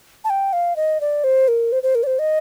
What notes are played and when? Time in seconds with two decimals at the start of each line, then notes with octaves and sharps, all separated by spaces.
0.24 A5
0.30 G5
0.53 F5
0.76 D#5
1.01 D5
1.24 C5
1.48 A#4
1.72 C5
1.83 C5
1.95 A#4
2.03 D5
2.07 C5
2.19 D#5